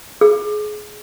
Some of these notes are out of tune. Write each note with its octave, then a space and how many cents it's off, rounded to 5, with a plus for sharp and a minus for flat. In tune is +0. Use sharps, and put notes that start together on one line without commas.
G#4 +20